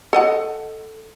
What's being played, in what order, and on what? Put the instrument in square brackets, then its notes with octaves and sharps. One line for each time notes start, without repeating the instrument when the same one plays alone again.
[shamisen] A4 D#5 F#5